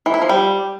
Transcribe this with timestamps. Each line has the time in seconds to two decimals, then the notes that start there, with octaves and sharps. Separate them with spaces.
0.06 E3
0.14 E4
0.22 F3
0.29 G3